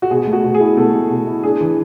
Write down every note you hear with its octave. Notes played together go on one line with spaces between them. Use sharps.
F#4
B2 G#4
A3
F#4
B2
G#4
E4
B2 A3 A4
A3
B2
E4
D4 G#4
E3